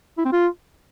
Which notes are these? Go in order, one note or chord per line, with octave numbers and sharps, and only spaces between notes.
E4
C4
F4